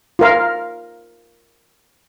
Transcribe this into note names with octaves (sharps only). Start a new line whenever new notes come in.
F4 A#4 F5